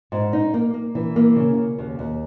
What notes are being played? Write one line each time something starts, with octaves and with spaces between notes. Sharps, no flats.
G#2
D#4
A#3
A#3
E3
A#3
C#3
C#3
D#2
D#2